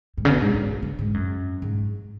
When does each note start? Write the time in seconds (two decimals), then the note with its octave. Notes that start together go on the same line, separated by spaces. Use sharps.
0.18 G#2
0.25 C#3
0.30 B2
0.42 G#2
0.54 G#2
0.82 C#3
0.99 G#2
1.14 F#2
1.62 G#2